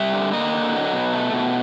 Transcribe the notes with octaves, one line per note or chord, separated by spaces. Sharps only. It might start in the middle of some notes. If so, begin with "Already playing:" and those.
Already playing: G3 E5
D3
A#3 D#5
D3
F#3
B2
A3
B2